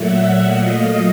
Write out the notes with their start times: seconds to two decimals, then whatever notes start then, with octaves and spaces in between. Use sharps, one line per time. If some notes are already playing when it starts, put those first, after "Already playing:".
Already playing: A#2 F#3 A3 E5 F#5
0.44 D#5 F5